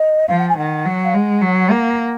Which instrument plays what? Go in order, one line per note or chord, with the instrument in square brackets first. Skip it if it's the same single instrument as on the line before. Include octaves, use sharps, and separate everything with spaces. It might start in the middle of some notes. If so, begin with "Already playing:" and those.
Already playing: [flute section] D#5
[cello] F3 [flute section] F5
[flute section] F#5
G#5
[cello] D#3 [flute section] F#5
[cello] F#3
[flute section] F5
[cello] G#3 [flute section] F#5
[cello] F#3
A#3